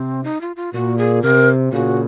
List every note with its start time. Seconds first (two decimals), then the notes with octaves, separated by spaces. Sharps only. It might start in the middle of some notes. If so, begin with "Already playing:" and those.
Already playing: C3 C4
0.24 D#4
0.41 F4
0.56 F4
0.73 A#2 F#4
0.98 G#4
1.22 C3 A#4
1.73 A#2 C#3 F#4